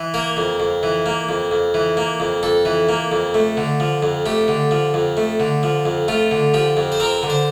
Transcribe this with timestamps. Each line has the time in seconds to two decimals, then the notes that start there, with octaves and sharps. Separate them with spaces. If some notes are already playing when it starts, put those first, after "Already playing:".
Already playing: E3
0.14 A#3 A#4
0.37 F2
0.60 F2
0.83 E3
1.06 A#3
1.29 F2
1.51 F2
1.74 E3
1.97 A#3
2.20 F2
2.43 F2 A4
2.65 E3
2.89 A#3
3.12 F2
3.34 A3
3.57 D3
3.80 F3
4.03 F2
4.26 A3 G4
4.48 D3
4.71 F3
4.94 F2
5.17 A3
5.40 D3
5.63 F3
5.86 F2
6.08 A3 F4
6.31 D3
6.54 F3 G4
6.77 F2
6.92 C5
7.00 C4 A#4
7.23 D3
7.30 C5